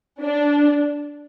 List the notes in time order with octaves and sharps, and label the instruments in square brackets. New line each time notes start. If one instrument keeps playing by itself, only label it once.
[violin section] D4